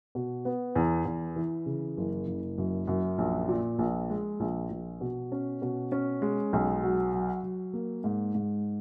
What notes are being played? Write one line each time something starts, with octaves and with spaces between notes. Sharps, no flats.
B2
B3
E2
E2
E3
C#3
F#1
F#1
F#2
F#2
A#1
A#2
A#1
G#3
A#1
A#1
B2
C#4
B2
C#4
G#3
B1
F#3
F#3
F#3
A#3
G#2
G#2